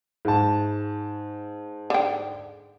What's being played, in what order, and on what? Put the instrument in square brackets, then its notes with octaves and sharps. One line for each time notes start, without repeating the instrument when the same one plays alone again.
[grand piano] G#2 A5
[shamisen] D3 G5